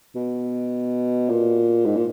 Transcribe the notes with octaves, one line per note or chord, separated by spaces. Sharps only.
B2
A#2
G#2
A#2